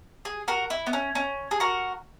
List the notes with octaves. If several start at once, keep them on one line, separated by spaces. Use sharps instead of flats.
G#4
F#4 A#4
E4
B3
C#4
C#4
G#4
F#4 A#4